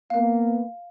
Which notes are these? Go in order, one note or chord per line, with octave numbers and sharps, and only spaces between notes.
A#3 B3 F5